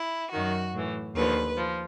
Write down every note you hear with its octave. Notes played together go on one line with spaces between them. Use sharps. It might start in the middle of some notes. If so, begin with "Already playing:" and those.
Already playing: E4
F#2 D#3 F#4
A2 E3
D#2 D3 F3 B4
F3